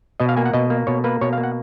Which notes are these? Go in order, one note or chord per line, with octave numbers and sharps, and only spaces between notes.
B2 D#5
F5
A#3 G#5
F#5
B2 D#5
A#3
B2 C#5
A#3 B4
B2 C#5
F5
A#3
F#5